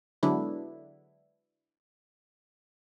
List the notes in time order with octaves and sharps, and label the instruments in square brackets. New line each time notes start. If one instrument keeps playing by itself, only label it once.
[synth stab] D3 F#3 G#3 B3 D4 E4